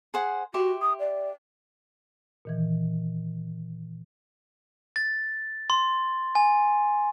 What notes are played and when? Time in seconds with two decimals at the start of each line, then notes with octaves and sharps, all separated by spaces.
0.14 G#4 C5 F#5
0.54 F#4 G4 E5 C6
0.82 D#6
1.00 D5
2.45 A#2 D#3 E3
4.96 A6
5.70 C6
6.35 G#5